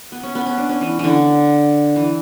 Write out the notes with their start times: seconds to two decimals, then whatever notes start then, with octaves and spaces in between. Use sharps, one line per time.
0.12 B3
0.23 C#4
0.35 B3
0.47 C#4
0.58 D4
0.69 C#4
0.81 E3
0.99 D3 E3
1.96 E3